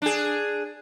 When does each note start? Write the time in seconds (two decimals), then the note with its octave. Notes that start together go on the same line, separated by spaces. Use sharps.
0.02 D4 G#4